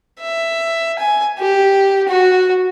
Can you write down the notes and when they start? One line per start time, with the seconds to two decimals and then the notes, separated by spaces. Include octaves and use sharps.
0.21 E5
0.99 G#5
1.38 G4
2.08 F#4